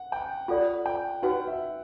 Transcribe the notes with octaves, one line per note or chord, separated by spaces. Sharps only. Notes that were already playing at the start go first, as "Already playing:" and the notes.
Already playing: F#5
G5
F4 A4 D5 F#5
G5
D#4 F#4 B4 F#5
E5